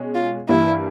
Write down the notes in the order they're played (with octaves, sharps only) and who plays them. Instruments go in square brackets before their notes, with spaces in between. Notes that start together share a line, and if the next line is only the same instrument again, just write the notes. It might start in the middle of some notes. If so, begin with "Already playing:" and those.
Already playing: [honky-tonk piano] B2 G#3 C#4
[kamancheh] F4
[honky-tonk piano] G2 E3 G3 A#3 [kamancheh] E4